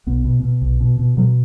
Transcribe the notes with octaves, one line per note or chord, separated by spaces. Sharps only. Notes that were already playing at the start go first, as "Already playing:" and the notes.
B1 B3
B2
B2
B1
B2
B2
B2 F#3